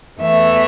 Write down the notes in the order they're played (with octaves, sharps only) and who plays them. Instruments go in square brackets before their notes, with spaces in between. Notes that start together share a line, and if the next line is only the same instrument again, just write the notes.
[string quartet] E2 E3 A3 E5